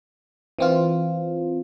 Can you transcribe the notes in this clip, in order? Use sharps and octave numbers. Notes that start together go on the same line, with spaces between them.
E3 C4 F4